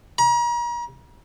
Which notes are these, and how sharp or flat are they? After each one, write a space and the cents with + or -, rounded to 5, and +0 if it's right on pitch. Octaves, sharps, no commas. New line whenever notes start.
A#5 +40